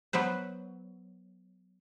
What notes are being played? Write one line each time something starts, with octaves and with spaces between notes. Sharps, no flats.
F#3 B3 B4 C5